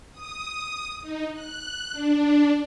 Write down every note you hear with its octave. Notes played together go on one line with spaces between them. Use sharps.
D#6
D#4
F#6
D4